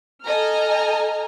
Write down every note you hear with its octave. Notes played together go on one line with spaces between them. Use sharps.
A4 D#5 G#5 A#5 F6